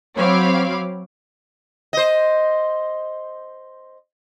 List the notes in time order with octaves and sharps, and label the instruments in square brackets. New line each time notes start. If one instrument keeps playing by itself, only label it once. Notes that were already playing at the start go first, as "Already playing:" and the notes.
[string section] F#3 C4 C#5 F5 B5 D6
[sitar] C5 D#5